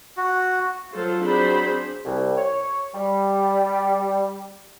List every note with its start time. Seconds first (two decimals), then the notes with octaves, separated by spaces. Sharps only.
0.17 F#4
0.93 F#3 F4 A4 C5
1.22 F#3 C4 D4 G#4 C5 B5
2.05 C2
2.38 C#5
2.94 G3